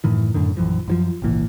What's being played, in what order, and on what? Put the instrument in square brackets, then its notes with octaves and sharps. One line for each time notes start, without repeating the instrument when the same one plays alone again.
[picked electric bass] F#2 A2 D#3 E3
F#2 A2 D3 D#3
A#1 F#2 E3 F3
F#2 E3 F3
G#1 C#2 A#2 E3